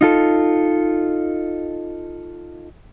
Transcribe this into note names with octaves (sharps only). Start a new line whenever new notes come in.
D#4 F4 A4